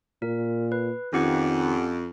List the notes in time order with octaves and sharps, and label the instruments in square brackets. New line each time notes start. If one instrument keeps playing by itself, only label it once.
[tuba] A#2 [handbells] A#4
[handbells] B4
[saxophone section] F2 [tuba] D#3 [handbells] C#4 G4 F#5